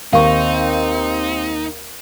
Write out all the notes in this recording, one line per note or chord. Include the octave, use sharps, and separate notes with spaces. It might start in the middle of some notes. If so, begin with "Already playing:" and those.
D#2 C4 D#4 F5 C#6